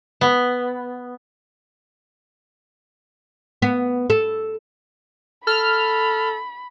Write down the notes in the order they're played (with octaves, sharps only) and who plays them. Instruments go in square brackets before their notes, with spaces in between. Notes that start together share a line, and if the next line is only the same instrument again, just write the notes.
[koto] B3
[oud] B3
A4
[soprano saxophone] A4 [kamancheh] B5 [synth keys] F6